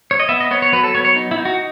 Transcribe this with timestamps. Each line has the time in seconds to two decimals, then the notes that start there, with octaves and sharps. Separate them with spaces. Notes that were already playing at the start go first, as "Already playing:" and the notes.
0.11 C#5
0.20 D#5
0.29 B3 E5
0.40 D#5
0.51 B3 C#5
0.62 C#5
0.72 F#3 B4
0.83 A4
0.95 B3 C#5
1.05 C#5
1.16 D#4
1.31 E4
1.38 D#4
1.45 F#4